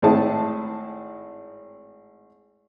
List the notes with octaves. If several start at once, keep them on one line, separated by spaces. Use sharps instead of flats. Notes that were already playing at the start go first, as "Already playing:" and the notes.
G#1 A2 C4 E4 G#4 A5